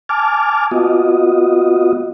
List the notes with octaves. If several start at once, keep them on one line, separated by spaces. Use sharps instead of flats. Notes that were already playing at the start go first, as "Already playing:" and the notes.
G#5 A5 D6 F6
B3 F4 F#4 D#5